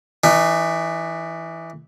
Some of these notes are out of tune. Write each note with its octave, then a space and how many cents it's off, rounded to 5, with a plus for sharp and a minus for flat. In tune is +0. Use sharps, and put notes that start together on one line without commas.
E3 +0 D#4 -40